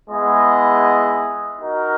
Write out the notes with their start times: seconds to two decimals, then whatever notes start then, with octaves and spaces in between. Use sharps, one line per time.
0.10 G#3 B3 E4 G#4 D#5
1.59 D#4 F#4 A#4